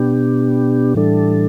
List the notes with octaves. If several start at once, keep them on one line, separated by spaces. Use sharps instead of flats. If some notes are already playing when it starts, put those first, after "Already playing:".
Already playing: B2 B3 D4 G4
A2 E3 G3 D4 A4